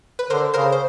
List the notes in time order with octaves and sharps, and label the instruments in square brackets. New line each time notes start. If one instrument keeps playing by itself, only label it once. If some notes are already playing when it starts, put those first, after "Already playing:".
[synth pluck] B4
[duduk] D3 [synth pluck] A#4 C5
[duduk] C#3 [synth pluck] A#4 C5
[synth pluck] C5